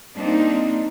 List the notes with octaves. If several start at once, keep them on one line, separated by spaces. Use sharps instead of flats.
G3 A#3 C4 D4 D#4